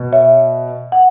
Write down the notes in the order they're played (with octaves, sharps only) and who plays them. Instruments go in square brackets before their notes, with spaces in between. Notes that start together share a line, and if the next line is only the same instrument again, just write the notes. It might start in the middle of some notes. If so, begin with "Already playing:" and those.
Already playing: [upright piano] B2
[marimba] C#5 E5
F#5